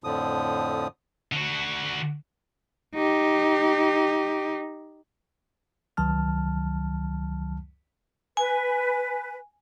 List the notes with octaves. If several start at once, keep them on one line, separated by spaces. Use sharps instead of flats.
F2 A2 D3 F3 D#6
D3 F#4
D#4 G4
C#2 D#3 F#3 A5 F6
B4 G#5